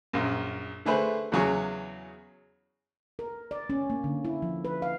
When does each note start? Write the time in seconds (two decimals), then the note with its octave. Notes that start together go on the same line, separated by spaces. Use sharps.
0.13 A#1 F#2
0.86 D3 A3 G#4 B4 C5
1.32 E2 C#3 F#3 G#4 C#6
3.19 A#4
3.51 D5
3.70 C#4
3.90 A#3
4.04 D3
4.25 E4
4.42 F3
4.65 B4
4.82 F5